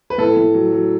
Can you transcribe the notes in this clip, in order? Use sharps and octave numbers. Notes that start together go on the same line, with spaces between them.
B4
A2 A4
A2
F#3
F#3